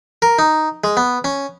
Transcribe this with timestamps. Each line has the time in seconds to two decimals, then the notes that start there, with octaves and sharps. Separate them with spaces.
0.22 A#4
0.39 D#4
0.84 G#3
0.97 B3
1.24 C#4